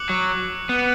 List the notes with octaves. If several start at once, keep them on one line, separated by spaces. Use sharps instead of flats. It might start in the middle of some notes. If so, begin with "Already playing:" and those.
Already playing: D6 F#6 C#7 F#7
F#3
B3